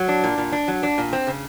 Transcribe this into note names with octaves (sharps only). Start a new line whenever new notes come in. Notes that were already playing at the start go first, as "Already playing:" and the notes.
Already playing: F#3
D4
A#2
A#2
D4
F#3
D4
A#2
C4
C#3